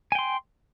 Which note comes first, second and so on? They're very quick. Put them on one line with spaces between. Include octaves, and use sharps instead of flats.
G#5 G5 C6